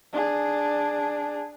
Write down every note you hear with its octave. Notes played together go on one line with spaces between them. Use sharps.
D4 G#4